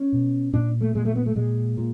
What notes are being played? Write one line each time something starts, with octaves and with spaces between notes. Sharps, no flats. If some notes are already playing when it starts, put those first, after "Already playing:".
Already playing: C#4
B2
A#2 D4
A3
A#2 G#3
A3
B3
A3
A#2 G#3
A#2